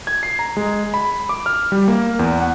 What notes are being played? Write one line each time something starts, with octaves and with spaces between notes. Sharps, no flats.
G#6
C7
A#5
G#3
B5
D6
F6
G3
A#3
E2
F#5